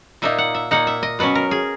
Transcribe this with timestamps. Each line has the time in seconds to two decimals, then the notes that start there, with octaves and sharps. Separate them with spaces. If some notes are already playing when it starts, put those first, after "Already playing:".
0.22 A#2 A#3 D#4 E5
0.38 F#5
0.55 E5
0.71 A#2 A#3 D#4 F#5
0.87 E5
1.03 D#5
1.19 B2 F#3 C#4 B4
1.35 A#4
1.51 G#4